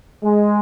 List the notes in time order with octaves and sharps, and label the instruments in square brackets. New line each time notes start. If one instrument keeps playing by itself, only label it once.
[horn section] G#3